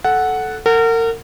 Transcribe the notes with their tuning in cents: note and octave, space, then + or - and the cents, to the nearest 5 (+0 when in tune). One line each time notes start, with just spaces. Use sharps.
A4 -10 F#5 +0
A#4 -35 F#5 +0